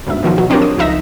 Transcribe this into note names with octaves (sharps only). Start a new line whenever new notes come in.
G1 D2 G#2 E5
B2 D#3 F3 F#3
B2 F#3
C4 D4 F4 G4 A#4 C#5
D#6
C#2 F3 D#4 E5 A#6